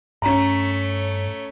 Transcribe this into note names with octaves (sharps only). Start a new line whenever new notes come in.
G2 A3 C#4 C#5 A#5